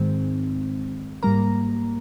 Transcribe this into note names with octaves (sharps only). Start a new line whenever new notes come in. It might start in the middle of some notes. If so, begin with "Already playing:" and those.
Already playing: G#2 D#3 G#3 C4
G#2 G3 A#3 A#5